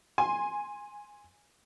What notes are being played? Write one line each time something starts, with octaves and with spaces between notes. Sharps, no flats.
G#5 C6